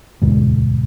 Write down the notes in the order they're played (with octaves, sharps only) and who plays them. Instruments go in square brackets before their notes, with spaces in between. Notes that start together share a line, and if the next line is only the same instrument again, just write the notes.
[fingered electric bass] E1 D2 G#2